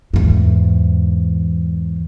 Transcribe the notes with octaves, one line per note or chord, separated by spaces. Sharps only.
E2 G#2